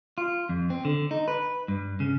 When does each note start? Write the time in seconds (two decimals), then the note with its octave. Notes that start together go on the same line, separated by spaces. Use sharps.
0.18 F4
0.49 F2
0.70 C4
0.85 D3
1.11 D#4
1.28 B4
1.68 G2
2.00 C#3